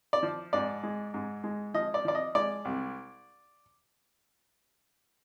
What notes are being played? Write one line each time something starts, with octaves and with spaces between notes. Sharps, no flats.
D5
F3
G#2 D5
G#3
G#2
G#3
F3 D#5
D5
F3 D5
D#5
G#3 D5
C2